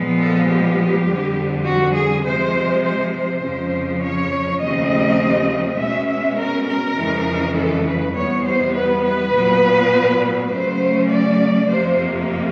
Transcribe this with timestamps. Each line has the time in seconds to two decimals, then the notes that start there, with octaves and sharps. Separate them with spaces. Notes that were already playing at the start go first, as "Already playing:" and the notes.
Already playing: A#2 F3 G#3 B3
0.17 A4
0.47 G4
1.07 F2 D3 G3 C4
1.66 F#4
1.95 G#4
2.24 C3 F3 G#3 C5
2.84 C5
3.12 C5
3.42 F2 C#3 F3
4.01 C#5
4.60 D#2 C#3 F3 A3 C4 D#5
5.78 B2 G#3 C#4 E5
6.08 E5
6.37 A#4
6.67 A#4
6.96 F2 C#3 E3 G#3
7.55 A4
7.86 B4
8.15 E2 C3 D#3 G3 B3 C#5
8.44 C5
8.73 B4
9.03 B4
9.33 A#2 F#3 B3
10.51 C#3 F#3 A3 C#4 C5
11.09 D5
11.68 F2 C3 F3 A#3 C5